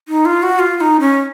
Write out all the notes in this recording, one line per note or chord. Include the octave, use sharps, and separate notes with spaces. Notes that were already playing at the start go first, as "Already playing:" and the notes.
D#4
F4
F#4
F4
F4
D#4
C#4